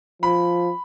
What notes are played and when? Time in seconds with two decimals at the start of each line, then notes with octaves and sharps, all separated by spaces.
0.22 F3 B5